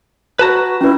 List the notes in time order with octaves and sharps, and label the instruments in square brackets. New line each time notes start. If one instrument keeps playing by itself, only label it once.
[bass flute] F#4 [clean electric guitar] B4 A5 A#5
[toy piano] C#4 B4 [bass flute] E4